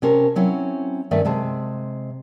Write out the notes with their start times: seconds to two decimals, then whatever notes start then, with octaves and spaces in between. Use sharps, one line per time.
0.02 C3 C#4 A#4 A5
0.36 F#3 C4 C#4 E4 C#5
1.11 G2 D#3 A3 C#4 D5 E5
1.25 C3 G#3 A5